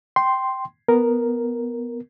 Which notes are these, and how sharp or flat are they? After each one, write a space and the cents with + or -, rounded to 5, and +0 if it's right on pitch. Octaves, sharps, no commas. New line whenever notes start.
G5 -10 C6 +0
B3 +0 A#4 +0